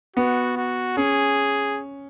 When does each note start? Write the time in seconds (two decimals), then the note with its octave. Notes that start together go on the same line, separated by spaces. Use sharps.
0.16 B3 F#4
0.57 F#4
0.97 C#4 G#4